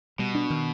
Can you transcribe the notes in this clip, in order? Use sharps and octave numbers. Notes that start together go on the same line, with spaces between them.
B2 G3
D4
D#3